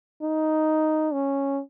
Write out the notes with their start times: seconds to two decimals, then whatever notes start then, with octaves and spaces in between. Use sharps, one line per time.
0.23 D#4
1.13 C#4